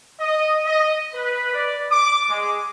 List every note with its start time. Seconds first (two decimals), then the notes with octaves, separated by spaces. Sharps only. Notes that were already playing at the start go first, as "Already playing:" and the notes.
0.19 D#5
0.65 D#5
1.14 B4
1.53 D5
1.91 D6
2.29 G#3